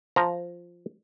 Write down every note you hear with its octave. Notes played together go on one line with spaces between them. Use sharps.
F3 A#5